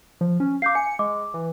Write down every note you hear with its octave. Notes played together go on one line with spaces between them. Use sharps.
F3
C#4
F5 D6 G6 C7
G#5 C#7
G#3 D6
E3